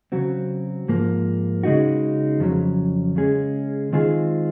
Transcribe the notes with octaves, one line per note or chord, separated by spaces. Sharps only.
C#3 F#3 C4 F#4
G#2 F3 A#3
C#3 G#3 D#4 F#4
F2 C#3 F#3 C#4
C#3 G#3 C#4 G#4
D#3 G#3 C4 F4 G#4